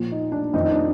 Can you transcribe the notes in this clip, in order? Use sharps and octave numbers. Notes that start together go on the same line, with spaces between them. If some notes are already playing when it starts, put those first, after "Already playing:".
Already playing: A#2 F3
D#4
D4
F2 D#3 D#4
D#4
D4